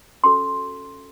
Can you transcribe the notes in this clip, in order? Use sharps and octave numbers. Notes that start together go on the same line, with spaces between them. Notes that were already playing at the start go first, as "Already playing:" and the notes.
C#4 F#4 A4 C6